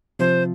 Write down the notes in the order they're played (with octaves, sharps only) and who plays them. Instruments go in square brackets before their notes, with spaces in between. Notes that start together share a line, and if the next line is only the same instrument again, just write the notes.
[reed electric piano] C3 F3 C4 F4 [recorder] C5